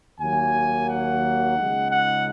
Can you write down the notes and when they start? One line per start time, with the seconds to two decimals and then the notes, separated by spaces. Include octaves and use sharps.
0.20 D#2 D#3 F#3 A#3 G#5
0.88 F#5
1.57 C#2 C#3 G#3 D#4
1.91 F#5